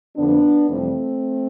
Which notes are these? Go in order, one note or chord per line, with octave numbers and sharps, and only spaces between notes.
F2 D3 F3 B3 D4
F2 C3 E3 G3 A3 C4